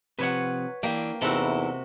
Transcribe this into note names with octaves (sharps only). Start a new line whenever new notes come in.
C3 F3 B4 C#5 F#5
E3 A#3 D4 G4
E2 C3 D#4 E4 F#4 A4